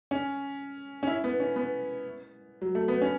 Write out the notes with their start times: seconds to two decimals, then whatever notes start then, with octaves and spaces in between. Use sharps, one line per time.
0.11 C#4
1.03 C#4
1.08 E4
1.24 B3
1.40 C#4
1.56 B3
2.62 F#3
2.75 A3
2.88 B3
3.01 C#4